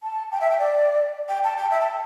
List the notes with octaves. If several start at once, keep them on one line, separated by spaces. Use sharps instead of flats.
A5
G5
E5
G5
D5
G5
A5
G5
E5
A5